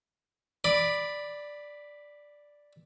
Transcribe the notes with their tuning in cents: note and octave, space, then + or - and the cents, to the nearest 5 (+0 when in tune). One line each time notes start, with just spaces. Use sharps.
D5 +0 B5 +0 D6 +20